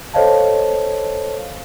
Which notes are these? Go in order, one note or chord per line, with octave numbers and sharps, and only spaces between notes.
A4 C5 C#5 D#5 F5 A5